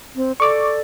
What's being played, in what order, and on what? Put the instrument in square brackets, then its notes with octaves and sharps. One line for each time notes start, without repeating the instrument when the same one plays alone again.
[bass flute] C4
[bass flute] A4 [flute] D5 [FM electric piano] C#6 D6